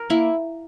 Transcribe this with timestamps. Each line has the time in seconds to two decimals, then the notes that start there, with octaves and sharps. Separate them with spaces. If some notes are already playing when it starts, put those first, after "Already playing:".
Already playing: A#4
0.10 A#3 E4